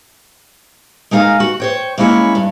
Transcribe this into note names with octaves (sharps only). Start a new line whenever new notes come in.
G#3 D#4 A#4 F5 G#5
F#4
C5 C#5 G5
G#3 A#3 C#4 E4 C#5
G2